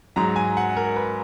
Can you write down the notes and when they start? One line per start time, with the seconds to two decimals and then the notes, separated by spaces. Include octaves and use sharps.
0.16 G#2 F#3 A#5
0.36 G#5
0.57 F#5
0.77 A#4
0.96 B4